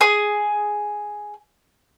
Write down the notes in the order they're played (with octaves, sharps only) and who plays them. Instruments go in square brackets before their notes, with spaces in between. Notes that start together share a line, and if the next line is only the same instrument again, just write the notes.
[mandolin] G#4 G#5 D#6